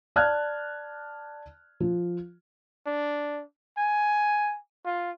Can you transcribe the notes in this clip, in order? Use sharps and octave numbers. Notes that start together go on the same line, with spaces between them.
D5 A5 F6 F#6 G#6
F3
D4
G#5
F4